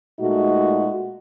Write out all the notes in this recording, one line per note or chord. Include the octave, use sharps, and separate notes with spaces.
A#2 G#3 A3 D#4 F#4